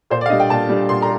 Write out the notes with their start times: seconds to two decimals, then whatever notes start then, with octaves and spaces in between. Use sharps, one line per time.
0.10 A#2 C5
0.21 D5
0.26 F5
0.30 G3 D4 D#5
0.40 G5
0.50 A#2 A5
0.69 G3 D4
0.89 A#2 C6
1.02 A#5